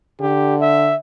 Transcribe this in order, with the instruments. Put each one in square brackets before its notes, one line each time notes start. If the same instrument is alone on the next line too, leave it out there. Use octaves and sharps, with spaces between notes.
[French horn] D3 [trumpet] G4
[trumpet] E5